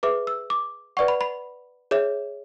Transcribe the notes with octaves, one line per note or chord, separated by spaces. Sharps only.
G#4 B4 E5 D6
E6
D6
B4 D5 F#5 C#6
B5
B5
G#4 C#5 E5